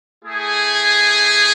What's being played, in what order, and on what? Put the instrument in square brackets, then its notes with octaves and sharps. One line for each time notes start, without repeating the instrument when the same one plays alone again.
[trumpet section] A3 E4 G#4